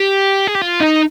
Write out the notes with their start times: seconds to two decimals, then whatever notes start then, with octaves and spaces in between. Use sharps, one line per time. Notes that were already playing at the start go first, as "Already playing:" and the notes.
Already playing: G4
0.47 G#4
0.55 G4
0.61 F4
0.80 D#4